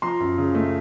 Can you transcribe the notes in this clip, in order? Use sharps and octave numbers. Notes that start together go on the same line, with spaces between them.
F3 A#5 C6
F#2
C#3
A3